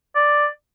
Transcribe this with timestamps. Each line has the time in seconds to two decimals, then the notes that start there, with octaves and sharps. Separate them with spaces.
0.16 D5